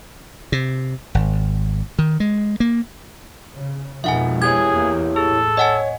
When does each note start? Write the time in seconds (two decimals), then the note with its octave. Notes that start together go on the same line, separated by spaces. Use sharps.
0.52 C3
1.15 G#1
1.99 D#3
2.20 G#3
2.60 A#3
3.56 C#3
4.04 F2 B2 F3 G#3 D#4 E5 F#5 G#5
4.42 E4 G4 G#4 C#5 G#6
4.74 E2 A#3
5.16 A2 G#4 A4
5.57 C#5 D#5 F#5 G#5